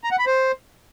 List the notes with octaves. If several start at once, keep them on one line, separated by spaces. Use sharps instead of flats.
A#5
F#5
B5
C5